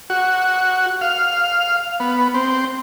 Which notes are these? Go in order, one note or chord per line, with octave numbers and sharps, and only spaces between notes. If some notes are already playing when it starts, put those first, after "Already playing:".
F#4
F5
B3
C4